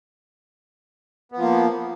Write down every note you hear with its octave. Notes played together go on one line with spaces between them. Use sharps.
F3 A#3 B3